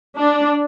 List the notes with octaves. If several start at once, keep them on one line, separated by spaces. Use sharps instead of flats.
D4